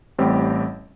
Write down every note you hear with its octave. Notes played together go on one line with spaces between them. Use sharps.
A1 A2 G3 C4 G4